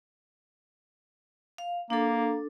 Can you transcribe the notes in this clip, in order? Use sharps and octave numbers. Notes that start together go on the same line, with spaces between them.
F5
A#3 D4 A4